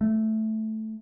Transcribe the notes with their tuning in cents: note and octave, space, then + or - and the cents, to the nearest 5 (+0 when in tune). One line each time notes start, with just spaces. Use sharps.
A3 -5